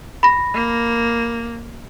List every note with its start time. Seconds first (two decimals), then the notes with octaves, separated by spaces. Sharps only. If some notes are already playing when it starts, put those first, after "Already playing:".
0.23 B5 A#6
0.54 A#3